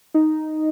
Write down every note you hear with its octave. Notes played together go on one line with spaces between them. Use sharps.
D#4